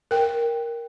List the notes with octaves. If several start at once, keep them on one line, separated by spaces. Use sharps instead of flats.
A#4 G5